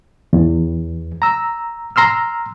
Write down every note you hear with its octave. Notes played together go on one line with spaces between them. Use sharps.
E2
A#5 E6
A#5 C6 E6 F6